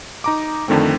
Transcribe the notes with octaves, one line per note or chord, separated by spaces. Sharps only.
D#4 A#5 D6
F2 D3 D#3 A3 C4